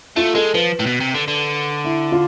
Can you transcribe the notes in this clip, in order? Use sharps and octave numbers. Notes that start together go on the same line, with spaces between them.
A3 F4
G#3 A4
F3 B4
A2
B2
C3
D3
D3
E4
F4